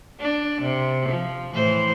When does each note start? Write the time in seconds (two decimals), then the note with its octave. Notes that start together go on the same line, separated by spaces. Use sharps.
0.20 D4
0.61 C3
1.09 F3
1.53 A2 E3 C5